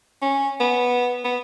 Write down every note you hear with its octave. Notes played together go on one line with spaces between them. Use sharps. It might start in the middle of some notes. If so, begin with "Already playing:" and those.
C#4
B3
B3